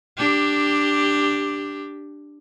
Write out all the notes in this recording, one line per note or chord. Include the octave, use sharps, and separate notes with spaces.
D4 G4